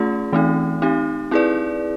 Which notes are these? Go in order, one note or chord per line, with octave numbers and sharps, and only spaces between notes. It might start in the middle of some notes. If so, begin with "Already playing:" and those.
Already playing: A3 C#4 F4 G#4
E3 A3 C4 D#4
C4 D#4 G4
C4 E4 G#4 B4 D5